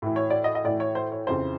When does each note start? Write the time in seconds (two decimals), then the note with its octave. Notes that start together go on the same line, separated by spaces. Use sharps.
0.02 A2 E3
0.16 C#5
0.30 D5
0.44 D#5
0.55 D#5
0.64 A2 E3 D5
0.80 C#5
0.95 C5
1.12 C#5
1.27 F2 C#3 E3 C5